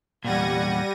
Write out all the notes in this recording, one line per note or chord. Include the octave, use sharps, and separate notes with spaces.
E2 A#2 G3 F#5 G#6 A#6 D#7